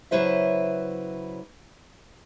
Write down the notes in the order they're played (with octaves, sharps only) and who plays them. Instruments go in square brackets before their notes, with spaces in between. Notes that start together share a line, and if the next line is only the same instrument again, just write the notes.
[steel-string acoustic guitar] C#3 F#3 E4 B4 C5 E5